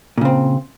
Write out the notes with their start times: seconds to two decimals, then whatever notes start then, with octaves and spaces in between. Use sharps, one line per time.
0.18 A#2
0.21 C#3
0.25 C4